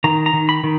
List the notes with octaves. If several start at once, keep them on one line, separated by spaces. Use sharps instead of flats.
D#3 A#5
A#5
D#3
B5
D#3